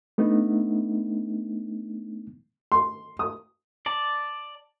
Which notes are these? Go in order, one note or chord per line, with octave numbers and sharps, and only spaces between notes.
A3 B3 D4 D#4
C6
D#6
D5 A5